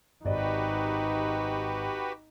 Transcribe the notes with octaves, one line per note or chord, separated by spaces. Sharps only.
G#1 D#4 F#4 G4 B4 D5 D#5